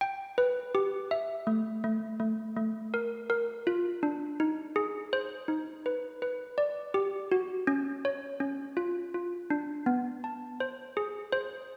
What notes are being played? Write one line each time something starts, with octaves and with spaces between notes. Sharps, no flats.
G5
B4
G4
E5
A3
A3
A3
A3
A#4
A#4
F4
D4
D#4
G#4
C5
D#4
B4
B4
D5
G4
F#4
C#4
C#5
C#4
F4
F4
D4
B3
A5
C5
G#4
C5